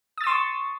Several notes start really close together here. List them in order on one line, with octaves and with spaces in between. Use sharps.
D#6 A6 E6 C6 C#6